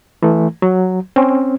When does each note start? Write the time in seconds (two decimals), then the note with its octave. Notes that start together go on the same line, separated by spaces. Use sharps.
0.23 E3 A3
0.62 F#3
1.16 C4 C#4